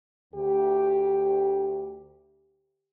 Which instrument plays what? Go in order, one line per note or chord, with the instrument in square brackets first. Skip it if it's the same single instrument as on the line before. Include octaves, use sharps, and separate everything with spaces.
[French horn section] D2 G4